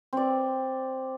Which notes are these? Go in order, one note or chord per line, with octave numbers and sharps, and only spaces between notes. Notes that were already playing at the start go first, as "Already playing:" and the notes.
C4 D5